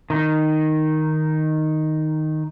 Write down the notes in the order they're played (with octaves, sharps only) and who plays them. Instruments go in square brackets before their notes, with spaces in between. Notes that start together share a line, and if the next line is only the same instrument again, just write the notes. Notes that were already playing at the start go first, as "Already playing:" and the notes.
[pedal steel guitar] D#3 D#4